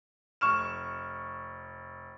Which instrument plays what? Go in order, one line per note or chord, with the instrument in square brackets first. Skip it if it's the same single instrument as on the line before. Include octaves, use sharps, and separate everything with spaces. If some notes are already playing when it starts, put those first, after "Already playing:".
[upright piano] F1 C#6 F6 E7